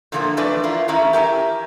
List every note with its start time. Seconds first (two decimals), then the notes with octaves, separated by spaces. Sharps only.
0.12 A#2 D3 E3 F3 A3 A#3
0.37 F2 E3 A3 D4 B4 D5
0.63 E4 F4 A#4
0.88 D#3 E3 A3 C#4 E4 A#5
1.13 G4 A#4 E5 G#5